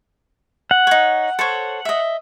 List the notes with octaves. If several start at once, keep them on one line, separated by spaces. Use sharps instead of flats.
F#5
D#4 C#5
A4 C5 C#5
D#5 E5